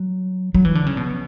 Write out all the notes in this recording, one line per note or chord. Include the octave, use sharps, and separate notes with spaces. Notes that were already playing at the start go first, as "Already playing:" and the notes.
Already playing: F#3
F#3
E3
D3
C#3
B2